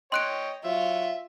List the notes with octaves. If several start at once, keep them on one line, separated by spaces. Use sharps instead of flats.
C#5 D#5 G5 C6 F#6 D7
F#3 F4 E5